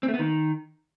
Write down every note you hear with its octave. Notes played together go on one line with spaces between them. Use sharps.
C4
A3
B3
D#3